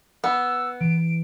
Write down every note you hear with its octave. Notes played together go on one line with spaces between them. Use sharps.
B3 E6
E3 D7